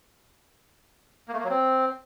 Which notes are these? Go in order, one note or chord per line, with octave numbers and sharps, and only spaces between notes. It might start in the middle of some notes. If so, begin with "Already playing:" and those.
A#3
A3
A#3
F#3
C4